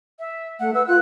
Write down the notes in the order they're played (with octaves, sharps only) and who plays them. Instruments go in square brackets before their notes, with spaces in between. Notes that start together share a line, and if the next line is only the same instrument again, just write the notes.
[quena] E5
[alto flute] A3 [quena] F#5
[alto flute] B4 [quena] E6
[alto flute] F4 [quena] F#6